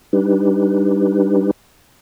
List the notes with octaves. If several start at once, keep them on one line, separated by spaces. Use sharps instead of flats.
G3 D4 D#4 G4 B4